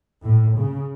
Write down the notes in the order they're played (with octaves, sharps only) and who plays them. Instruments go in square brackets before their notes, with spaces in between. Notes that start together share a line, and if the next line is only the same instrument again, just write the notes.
[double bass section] A2
C#3